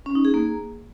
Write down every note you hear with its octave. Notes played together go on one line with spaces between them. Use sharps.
C#4
D#4
G#4
A#3